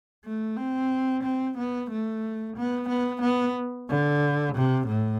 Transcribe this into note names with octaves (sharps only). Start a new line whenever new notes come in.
A3
C4
C4
B3
A3
B3
B3
B3
D3
C3
A2